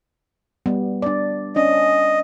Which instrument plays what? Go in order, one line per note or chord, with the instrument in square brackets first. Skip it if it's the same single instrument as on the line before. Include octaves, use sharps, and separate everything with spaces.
[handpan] G3 B3
D4 D5
[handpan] C#4 D4 [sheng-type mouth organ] D#5